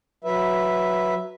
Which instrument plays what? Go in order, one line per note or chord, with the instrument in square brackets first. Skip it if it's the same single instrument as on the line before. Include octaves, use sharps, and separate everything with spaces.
[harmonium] F#3 B4 E5